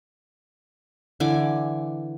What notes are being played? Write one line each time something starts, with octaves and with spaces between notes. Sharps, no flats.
D3 E3 G#5 D6